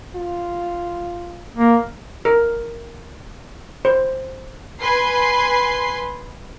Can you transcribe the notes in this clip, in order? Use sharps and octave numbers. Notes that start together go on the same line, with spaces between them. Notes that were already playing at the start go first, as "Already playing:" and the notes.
F4
A#3
A#4
C5
B4 G#5 C6 C7